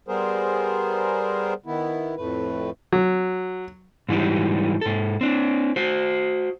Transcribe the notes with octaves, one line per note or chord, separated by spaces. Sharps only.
G3 B3 G#4 A#4 C5
D#3 B3 E4
F2 A2 A3 B4
F#3
G#2 E3 F#3 G3 D#4
G#2 A4
C4 D4
F#4 C5